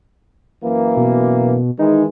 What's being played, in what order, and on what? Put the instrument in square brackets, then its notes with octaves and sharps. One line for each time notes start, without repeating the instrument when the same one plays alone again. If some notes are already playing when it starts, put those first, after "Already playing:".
[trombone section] F#2 E3 A#3
[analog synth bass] B2
[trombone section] D#3 E3 G#3 [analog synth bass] D#4